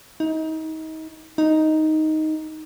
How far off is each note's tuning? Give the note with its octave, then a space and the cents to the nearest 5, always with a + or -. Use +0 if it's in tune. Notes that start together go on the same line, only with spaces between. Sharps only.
D#4 +30
D#4 +5